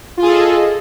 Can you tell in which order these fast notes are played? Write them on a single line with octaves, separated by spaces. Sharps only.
F4 G#4 A4 D#5